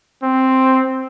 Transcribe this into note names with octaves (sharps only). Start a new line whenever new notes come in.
C4